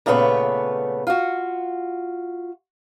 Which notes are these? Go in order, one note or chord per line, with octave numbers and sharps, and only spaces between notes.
A#2 C#3 A3 B3 B4 C#5
F4 F#4